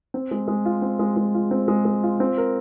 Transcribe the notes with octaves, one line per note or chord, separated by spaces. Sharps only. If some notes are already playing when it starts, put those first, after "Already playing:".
C4
G#3
G#3
F4
C4
G#3
G#3
F4
C4
G#3
G#3
F4
C4
A#4